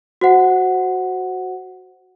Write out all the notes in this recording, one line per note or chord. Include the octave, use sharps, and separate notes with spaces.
F#4 C5 F#5